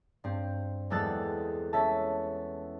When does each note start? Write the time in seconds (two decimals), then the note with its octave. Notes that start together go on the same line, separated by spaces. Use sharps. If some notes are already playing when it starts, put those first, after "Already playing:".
0.24 G2 C4
0.90 E2 G3 G#3 A4 F#6 A6
1.73 C#4 E5 A5